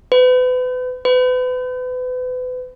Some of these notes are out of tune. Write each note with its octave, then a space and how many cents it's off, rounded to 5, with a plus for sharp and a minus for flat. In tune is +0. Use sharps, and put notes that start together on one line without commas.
B4 +35
B4 +35